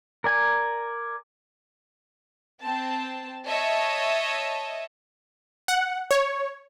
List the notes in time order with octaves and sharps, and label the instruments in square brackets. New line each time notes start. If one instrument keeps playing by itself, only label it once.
[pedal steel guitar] A#4 D5 G#5
[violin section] C4 A5
C#5 D#5 E5 A5
[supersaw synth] F#5
C#5